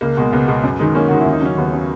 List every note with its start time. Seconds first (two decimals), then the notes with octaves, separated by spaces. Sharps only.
0.01 C#2 A#3
0.17 B2 G#3
0.32 C#2 B3
0.48 B2 G#3
0.63 F#2
0.79 D#3 G#3
0.95 F#2 A#3 C#4
1.09 D#3 G#3 F#4
1.20 E4
1.26 D#2
1.32 D#4
1.41 C#3 F#3 C#4
1.57 D#2 B3
1.73 C#3 F#3